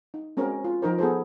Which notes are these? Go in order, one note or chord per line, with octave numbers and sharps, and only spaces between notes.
D#4
G#3 C4 C#4 F#4 A#4
F4
F3 D#4 A#4 C5
B3 G#4 A4 C5